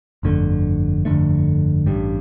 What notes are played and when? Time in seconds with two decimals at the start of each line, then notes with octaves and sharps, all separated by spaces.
0.23 G1 F2 D3 A3
1.05 G1 F2 D3 A3
1.86 A1 G2 G3